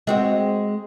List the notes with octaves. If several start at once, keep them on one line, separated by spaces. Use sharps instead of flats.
G#3 C4 F#4